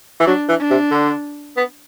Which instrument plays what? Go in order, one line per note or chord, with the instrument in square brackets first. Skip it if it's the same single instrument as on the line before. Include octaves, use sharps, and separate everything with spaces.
[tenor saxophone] E3
[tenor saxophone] F#3 [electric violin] D4
[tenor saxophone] E3
[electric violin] D4
[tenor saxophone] C3
D3
B3